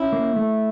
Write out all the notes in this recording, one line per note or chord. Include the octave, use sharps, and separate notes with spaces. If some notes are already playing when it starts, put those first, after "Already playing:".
Already playing: C#4 E4
A#3
A3